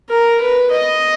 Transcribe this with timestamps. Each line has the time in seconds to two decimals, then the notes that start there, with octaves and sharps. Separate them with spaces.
0.09 A#4
0.41 B4
0.72 D#5